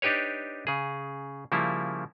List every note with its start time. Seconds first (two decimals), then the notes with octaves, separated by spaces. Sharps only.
0.02 D4 D#4 G4 B4 C#5
0.67 C#3 G#4
1.52 C#3 F3 G3 A#3 E4